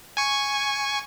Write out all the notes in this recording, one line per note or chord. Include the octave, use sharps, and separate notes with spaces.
G#5 C#6